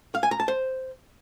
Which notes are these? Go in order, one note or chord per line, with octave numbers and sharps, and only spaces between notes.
F5
G#5
A#5
A5
C5